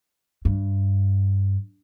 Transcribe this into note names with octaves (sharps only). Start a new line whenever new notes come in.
G2